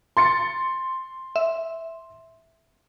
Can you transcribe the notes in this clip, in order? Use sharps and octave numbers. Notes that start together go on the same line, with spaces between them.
C6 A6 C#7
E5